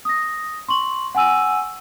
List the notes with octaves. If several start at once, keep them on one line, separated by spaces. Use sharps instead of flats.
D#6 A#6
C6 C#6 F#7
F#5 G#5 E6 D#7